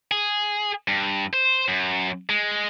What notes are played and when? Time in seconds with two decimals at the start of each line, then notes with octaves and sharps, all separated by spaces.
0.11 G#4
0.88 G2
1.33 C5
1.68 F#2
2.29 G#3